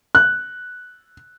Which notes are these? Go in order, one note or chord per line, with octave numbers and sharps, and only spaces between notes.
F#6